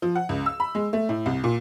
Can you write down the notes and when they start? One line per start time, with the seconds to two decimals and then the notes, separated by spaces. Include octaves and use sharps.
0.02 F3
0.16 F#5
0.29 C#2
0.46 E6
0.60 B5
0.75 G#3
0.93 A3
1.09 A2
1.26 C2
1.44 A#2